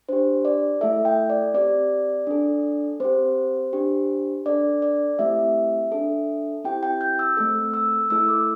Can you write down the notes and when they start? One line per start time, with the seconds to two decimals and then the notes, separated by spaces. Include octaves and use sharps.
0.09 D4 G4 C5
0.45 D5
0.81 A3 E4 A4 E5
1.05 G5
1.30 D5
1.54 C4 G4 D5
2.27 D4 A4
3.00 C4 G4 C5
3.73 D4 G4
4.45 D4 A4 D5
4.82 D5
5.19 A3 C4 E4 G4 E5
5.92 D4 A4
6.65 C4 E4 G4 G5
6.83 G5
7.01 G6
7.19 E6
7.37 A3 C4 A4 E6
7.74 E6
8.10 A3 E4 A4 E6
8.28 D6